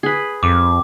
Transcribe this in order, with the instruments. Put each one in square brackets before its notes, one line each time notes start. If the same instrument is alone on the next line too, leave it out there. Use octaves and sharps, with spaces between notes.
[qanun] G#4 B4
[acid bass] F2 [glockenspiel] D6